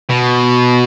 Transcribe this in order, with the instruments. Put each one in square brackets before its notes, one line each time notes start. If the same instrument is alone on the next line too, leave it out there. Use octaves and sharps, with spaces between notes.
[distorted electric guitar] B2